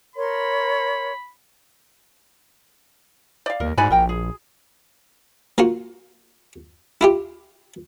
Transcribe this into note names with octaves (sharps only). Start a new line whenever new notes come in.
A#4 C#5 B5 C6
D5 F5
D#2 A#4
G#2 F#4 D5 F#5 G#5 B5
A#1 A#4 G5 A#5
G#4
A#3 F4 F#4
E4 F4 G4